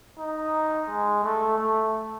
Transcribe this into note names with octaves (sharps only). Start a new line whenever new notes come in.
D#4
G#3
A3
A3